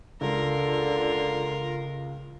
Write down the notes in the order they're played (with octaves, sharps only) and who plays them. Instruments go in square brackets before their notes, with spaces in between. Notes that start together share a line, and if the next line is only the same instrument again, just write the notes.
[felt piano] C#2 [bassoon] D3 [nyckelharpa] F4 A#4